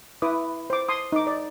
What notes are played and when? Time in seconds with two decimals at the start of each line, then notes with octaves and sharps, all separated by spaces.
0.22 E4 B4 D6 D#6
0.70 C5 D6
0.89 A5 C6 D#6
1.12 D#4 D6
1.27 D5